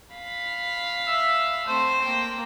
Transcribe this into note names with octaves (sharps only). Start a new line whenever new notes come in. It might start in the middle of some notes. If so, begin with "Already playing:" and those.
F5 B5
E5
A3 C4 C5
A#3 G5